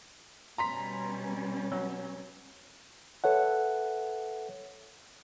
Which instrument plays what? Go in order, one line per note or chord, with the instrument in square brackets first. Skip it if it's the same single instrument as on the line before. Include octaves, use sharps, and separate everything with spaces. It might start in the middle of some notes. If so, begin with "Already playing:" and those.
[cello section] B2 G3 C#4 [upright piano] A#5 C6 B6
[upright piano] F#3
[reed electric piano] A4 B4 C#5 E5 F#5